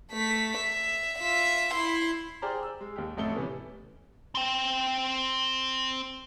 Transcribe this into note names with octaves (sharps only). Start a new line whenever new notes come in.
A3 B6
E5
F4 E5
E4 C6
G#4 C5 D5 G5 A#5 F6
E6
G#3
D#2 G4
A1 F2 A3 A4 G7
C3 E3 B3 C#4
C4 G5